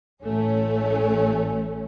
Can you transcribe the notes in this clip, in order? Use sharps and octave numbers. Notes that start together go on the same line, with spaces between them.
A1 A2 A3 C#4